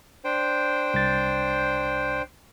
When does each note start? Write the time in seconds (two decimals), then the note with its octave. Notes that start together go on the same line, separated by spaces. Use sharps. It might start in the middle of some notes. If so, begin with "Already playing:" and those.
0.24 D4 C5 G5
0.94 C2 A6